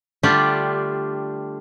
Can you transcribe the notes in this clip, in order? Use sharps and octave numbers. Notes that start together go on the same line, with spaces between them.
D3 G3 A3 D4 F4 G4